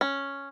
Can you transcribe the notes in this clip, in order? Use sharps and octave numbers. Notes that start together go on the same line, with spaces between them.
C#4